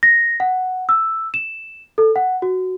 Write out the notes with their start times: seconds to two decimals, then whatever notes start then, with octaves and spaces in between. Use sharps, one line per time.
0.03 A#6
0.40 F#5
0.89 E6
1.34 E7
1.98 A4
2.16 F#5
2.42 F#4